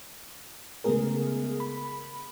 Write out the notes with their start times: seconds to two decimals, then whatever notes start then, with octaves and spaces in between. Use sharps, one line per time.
0.84 C#3 G#3 A3 B3 G#4 A#4
1.60 B5